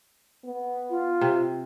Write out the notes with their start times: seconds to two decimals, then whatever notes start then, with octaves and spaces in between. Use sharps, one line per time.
0.45 B3
0.90 F4
1.21 C3